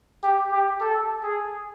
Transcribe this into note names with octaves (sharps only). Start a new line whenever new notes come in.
G4
G4
A4
G#4